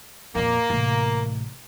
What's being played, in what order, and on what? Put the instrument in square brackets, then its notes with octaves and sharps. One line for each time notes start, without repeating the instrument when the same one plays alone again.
[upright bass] F2 A#2 [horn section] A#3
[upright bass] A1 C3